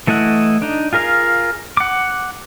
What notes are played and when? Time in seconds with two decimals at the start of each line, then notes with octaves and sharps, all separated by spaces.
0.07 E3 A3 E4 D#5 F#5
0.62 D4 D#4
0.93 F4 G#4 A#4 F5
1.77 F#5 D6